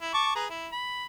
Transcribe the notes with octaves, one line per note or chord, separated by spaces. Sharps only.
E4
A5 C#6 D6
G#4 B4 A#5
E4
B5